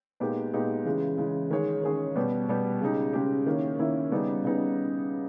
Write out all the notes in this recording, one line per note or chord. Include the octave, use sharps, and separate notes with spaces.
A#2 G#3 B3 D#4 G4
A#2 G#3 B3 D#4 G4
C#3 E3 G#3
C#3 E3 G#3
D#3 G#3 C#4 G#4 C#5
D#3 G#3 C#4 G#4 C#5
B2 G3 B3 G4
B2 G3 B3 G4
C#3 G#3 D#4 G4
C#3 G#3 D#4 G4
D#3 A#3 C#4 E4
D#3 A#3 C#4 E4
C#3 G3 B3 D#4 G#4
C#3 G3 B3 D#4 G#4